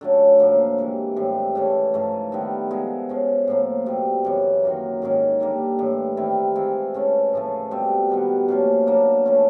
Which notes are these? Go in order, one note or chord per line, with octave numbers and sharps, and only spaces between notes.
D3 F#3 A3 C#4
A2 F3 A#3
C3 E3 G#3
A2 E3 G3 C4
C#3 E3 A3
G#2 F3 A3
D#3 G3 B3 E4
F3 G#3 B3
F3 G#3 C#4
A2 F3 A#3
B2 G3 C4
F#2 C#3 E3
D#3 F#3 A#3
G#2 D#3 G#3 C#4
D3 G3 A#3
A2 E3 G3
D#3 G3 C4 E4
E3 G#3 C4 F4
C#3 E3 A3 C#4
A2 F3 A3
B2 G3 C4
D#3 G3 B3
A#2 F3 A3 C#4
B2 F#3 A#3 D4
F3 A3 C#4